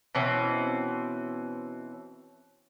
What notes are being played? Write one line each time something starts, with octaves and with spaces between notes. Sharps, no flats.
B2 E3 C4 C#4